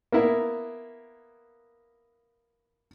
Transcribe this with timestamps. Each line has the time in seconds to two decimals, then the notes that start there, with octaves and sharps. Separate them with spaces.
0.12 A#3 B3 E4 A#4